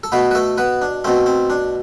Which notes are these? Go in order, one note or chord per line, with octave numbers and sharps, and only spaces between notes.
A4
B2 A3 B3 B4
B4
A3 A4
B3 B4
D4
B2 A3 C4
C4
D4